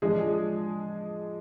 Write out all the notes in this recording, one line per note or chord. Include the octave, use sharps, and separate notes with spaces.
F3 G#3 D4 G#4